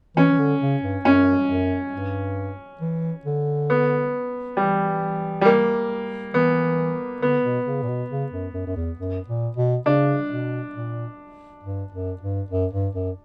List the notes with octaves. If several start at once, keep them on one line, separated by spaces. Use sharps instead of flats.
E3 C#4
E3
D3
C#3
G2
F#2 C#4
F#2
G2
E3
D3
B3
E3 G3
G3
A#3
E3 B3
D3 B3
B2
C#3
A#2
B2
C#3
F#2
F#2
F#2
E2
F#2
A#2
B2
C#3 D4
B2
A#2
G2
F#2
G2
F#2
G2
F#2